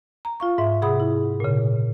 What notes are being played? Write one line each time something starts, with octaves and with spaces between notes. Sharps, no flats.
A#5
F4 F5 C#6
G#2 E5
C3 G#4 F#5 B5 D#6
E4
A#2 C#3